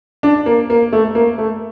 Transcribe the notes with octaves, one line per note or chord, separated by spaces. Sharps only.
D4
A#3
A#3
A3
A#3
A3